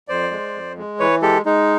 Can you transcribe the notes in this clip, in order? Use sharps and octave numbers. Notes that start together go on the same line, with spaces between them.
F2 C5 D5
G#3
F2
G#3
E3 B4 C#5
G#3 G4 A4
G#3 D#4